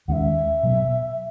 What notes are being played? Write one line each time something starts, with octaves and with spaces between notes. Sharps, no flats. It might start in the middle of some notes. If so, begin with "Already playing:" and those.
D#2 D#3 G#3 C#4 E5 F#5
B2 F#3 B3